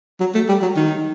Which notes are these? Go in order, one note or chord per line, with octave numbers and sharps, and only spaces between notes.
F#3
A3
G3
F#3
D#3